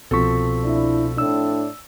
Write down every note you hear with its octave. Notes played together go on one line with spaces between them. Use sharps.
C2 B2 F3 C4 A4 C#6 B6
D4 E4
A2 D4 E6